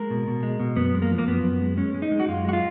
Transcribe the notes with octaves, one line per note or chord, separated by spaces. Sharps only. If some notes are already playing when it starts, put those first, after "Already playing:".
Already playing: G#3 A#4
B2
B2
G#3
B2
F#2 B3
G#3
A#3
F3
A#3
F#2 B3
F#2
G#3
G#3 C#4
G#3
D#4
G#3
F#4
F#2 F4
G#3 F#4
F4